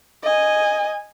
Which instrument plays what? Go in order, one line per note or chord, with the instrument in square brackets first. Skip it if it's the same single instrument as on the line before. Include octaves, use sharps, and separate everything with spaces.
[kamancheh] D#5 G#5